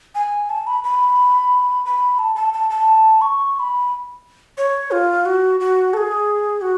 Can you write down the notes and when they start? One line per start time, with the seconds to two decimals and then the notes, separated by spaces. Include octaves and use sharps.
0.15 G#5
0.50 A5
0.67 B5
0.84 B5
1.86 B5
2.19 A5
2.36 A5
2.53 A5
2.70 A5
3.21 C#6
3.56 C#6
3.59 B5
4.58 C#5
4.91 F4
5.26 F#4
5.60 F#4
5.93 A4
5.97 G#4
6.61 F#4